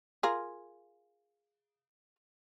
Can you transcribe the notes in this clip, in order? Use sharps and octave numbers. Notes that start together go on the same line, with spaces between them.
F4 G#4 A#4